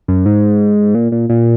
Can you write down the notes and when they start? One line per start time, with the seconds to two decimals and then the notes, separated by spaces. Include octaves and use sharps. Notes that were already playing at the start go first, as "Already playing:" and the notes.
0.08 F#2
0.26 G#2
0.95 A#2
1.12 A#2
1.29 A#2